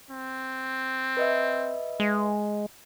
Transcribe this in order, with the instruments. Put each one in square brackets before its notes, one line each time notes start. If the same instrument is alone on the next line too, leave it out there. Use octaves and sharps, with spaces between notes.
[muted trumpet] C4
[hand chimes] B4 D#5 E5
[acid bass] G#3